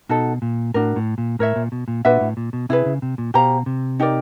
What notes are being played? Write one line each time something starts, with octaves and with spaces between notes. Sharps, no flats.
B2 D#4 F#4 A4
A#2
A2 D4 F#4 A#4
A2
A#2
A2 A#4 C#5 E5
A#2
B2
A#2
A#2 D4 F#4 B4 E5
A2
A#2
B2
C3 E4 G#4 B4
C#3
C3
A#2
B2 G4 C5 F5 A#5
C3
D#4 G4 A#4 D5